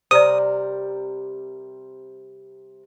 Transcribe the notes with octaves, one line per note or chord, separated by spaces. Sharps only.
C3 G3 A#4 C5 D5 D#6